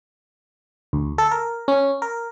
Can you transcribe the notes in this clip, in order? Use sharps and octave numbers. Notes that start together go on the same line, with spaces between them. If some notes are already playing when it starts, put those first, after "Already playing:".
D2
A4
A#4
C#4
A#4